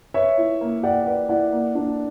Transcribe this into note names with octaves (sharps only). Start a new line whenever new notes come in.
B4 C#5 E5
E4
A#3
G4 D5 F#5
B4 D5 F#5
E4 D5 F#5
A#3
D4